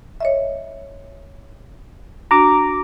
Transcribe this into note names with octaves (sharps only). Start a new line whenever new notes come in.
C#5 D#5 E5
D4 F#4 A#5 D6